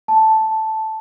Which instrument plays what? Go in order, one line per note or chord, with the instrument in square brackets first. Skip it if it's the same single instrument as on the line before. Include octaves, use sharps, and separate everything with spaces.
[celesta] A5